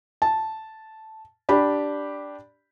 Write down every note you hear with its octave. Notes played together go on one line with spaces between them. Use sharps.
A5
D4 G4 B5